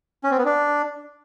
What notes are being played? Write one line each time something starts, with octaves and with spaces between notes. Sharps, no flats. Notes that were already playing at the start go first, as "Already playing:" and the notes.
C#4
C4
B3
D4